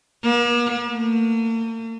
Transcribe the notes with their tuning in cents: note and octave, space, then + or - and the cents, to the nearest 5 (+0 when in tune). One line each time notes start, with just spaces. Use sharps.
A#3 +45
A#3 -45